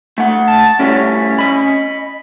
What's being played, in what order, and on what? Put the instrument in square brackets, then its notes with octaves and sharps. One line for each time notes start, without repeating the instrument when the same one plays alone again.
[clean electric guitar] A3 F#5
[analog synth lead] A5
[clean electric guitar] A2 G3 [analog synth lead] C#4
[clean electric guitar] D#5 B5